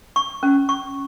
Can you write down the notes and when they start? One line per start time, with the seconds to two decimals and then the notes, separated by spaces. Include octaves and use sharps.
0.16 C#6
0.43 C#4
0.69 C#6